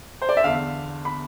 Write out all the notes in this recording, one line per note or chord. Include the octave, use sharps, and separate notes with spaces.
C5
D5
E5
E2 D3 F5
B5